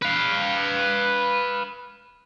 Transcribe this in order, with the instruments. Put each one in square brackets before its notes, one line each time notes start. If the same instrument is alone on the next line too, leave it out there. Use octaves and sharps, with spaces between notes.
[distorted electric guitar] B4 F5